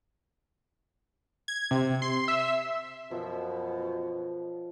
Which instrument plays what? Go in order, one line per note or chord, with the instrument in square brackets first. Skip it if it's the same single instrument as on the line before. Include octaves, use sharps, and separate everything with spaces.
[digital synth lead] G#6
C3
C6
E5
[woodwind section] F#2 B2 [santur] F3